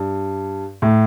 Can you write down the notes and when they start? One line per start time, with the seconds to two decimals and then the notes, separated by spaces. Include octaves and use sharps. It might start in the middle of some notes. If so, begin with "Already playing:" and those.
Already playing: G2
0.82 A2